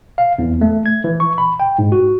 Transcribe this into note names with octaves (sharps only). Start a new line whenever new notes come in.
F5
E2
A3
G#6
E3
C#6
B5
G5
G#2
F#4